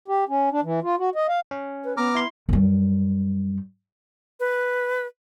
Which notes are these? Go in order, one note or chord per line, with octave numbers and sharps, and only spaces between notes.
G4
C#4
D4
E3
F4
F#4
D#5
F5
C#4
B4
B3 A#5 D6 F6
E4 C6
F#2 G3
B4